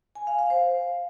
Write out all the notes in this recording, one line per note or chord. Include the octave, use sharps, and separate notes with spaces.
G#5
F5
F5
C5